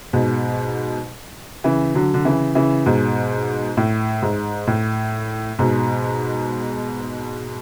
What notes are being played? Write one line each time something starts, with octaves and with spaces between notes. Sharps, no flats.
G#2 B2
C#3 E3
D3 F#3
D3
C#3 E3
C#3 E3
G#2 B2
A2
G#2
A2
G#2 B2